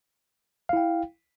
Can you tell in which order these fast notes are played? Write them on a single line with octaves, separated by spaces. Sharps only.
F5 E4 G5